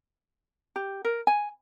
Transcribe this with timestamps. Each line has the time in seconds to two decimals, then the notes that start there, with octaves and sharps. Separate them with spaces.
0.76 G4
1.05 A#4
1.27 G#5